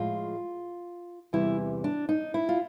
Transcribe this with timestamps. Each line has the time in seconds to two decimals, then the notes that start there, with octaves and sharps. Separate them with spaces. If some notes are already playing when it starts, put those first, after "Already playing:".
Already playing: A2 F3 G#3 F4
1.33 E2 C3 E3 G3 E4
1.84 D4
2.09 D#4
2.34 E4
2.49 F4